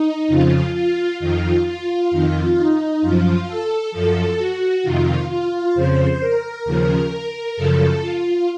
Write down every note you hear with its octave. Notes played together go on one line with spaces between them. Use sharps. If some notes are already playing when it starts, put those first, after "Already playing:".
Already playing: D#4
F2 C#3 F3 F4
F4
F2 D#3 F4
F4
F2 D#3
D#4
F#2 F3 F4
A4
F#2 F3 A4
F#4
F2 C3 D#3 F4
F4
F2 C#3 F3 C5
A#4
D#2 C#3 F3
F#2 C#3 F3 A4
F4